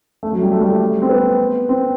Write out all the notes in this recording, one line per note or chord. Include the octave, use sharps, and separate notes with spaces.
A3
F#3
G3
A3
G3
A3
C4
B3
C4